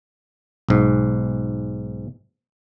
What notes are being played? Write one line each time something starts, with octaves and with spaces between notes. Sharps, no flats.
B1 G#2